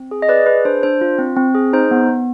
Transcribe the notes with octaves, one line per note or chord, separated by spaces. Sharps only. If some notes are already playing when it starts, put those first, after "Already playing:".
Already playing: C4
G#4
D#5
G#4 B4 D5
G#4 B4
D4 C5
D4 C5
F4
C4
C4
G#4
D#4 C5
B3
B3